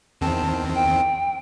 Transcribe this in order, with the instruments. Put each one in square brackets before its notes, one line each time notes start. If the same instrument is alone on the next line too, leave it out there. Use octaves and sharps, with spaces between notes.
[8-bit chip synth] E2 D#3 C4 [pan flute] A5
[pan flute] G5